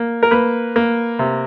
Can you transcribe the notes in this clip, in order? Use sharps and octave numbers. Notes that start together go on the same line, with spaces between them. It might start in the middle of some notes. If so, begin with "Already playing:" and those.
Already playing: A#3
A#4
A#3 B4
A#3
C3